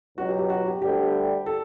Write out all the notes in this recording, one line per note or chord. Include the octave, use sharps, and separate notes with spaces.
C#2 B2 F#3 F#4
G4
G4
F#4
G4
D2 D3 G3 G4
A4